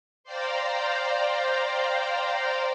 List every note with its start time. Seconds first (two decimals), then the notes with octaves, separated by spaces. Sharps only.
0.24 C5 D5 F5 G5 A#5 C6